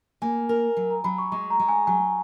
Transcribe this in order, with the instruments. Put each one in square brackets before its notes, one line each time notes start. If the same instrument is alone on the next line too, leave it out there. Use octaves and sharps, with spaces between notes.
[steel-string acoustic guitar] A#3 [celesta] G#5
[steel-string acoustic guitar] A#4
F#3
[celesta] A#5
[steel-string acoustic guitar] F#3 [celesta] B5
[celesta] C#6
[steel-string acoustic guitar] G#3 [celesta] C#6
[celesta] A#5
[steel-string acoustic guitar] G#3
[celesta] G#5
[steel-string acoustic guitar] F#3 [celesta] G#5